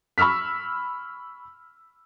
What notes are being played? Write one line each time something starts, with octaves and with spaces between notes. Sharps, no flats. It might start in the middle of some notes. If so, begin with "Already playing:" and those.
B5 C#6 E6 F6 B6